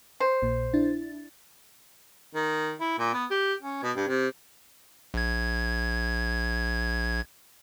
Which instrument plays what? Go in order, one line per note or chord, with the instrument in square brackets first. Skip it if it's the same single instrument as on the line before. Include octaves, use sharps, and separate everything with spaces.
[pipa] C5
[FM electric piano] A#1 A#2
D4 E4 A6
[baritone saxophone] D#3
E4
A#2
B3
G4
C#4
B2
G2
C3
[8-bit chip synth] A#1 G#6